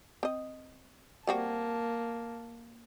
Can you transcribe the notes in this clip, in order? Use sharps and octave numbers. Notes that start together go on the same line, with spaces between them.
C4 D#5
G3 A#3 C4 F#4 A5